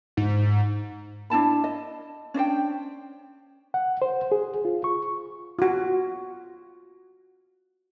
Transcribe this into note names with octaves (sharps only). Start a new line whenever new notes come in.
G#2
D4 E4 A5 B5
D#5
C#4 D4 C5 G5
F#5
C5
G#4
F4
C#6
F4 F#4